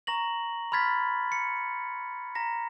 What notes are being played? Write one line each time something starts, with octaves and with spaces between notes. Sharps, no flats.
A#5 C#6 A#6 F#7
B5 C6 F6 G#6 A6 B6
C#7
A#5 A#6 B6